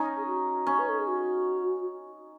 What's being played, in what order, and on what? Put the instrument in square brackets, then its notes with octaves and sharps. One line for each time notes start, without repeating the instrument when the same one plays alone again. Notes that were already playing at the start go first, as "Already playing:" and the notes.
Already playing: [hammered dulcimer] C#4 D#4
[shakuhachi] G#4
F#4
[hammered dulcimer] C#4
[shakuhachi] B4
A4
G#4
F#4